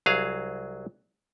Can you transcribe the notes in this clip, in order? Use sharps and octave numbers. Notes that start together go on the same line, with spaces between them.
C2 F#3 G#4 F5